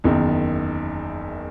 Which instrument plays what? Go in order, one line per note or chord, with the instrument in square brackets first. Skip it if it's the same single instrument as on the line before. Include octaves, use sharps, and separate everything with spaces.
[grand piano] F#1 E2 D#3